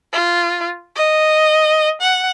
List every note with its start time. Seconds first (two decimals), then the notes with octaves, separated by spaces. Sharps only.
0.13 F4
0.95 D#5
2.01 F#5